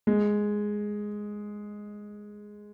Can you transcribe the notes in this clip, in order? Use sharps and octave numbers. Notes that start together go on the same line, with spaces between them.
G#3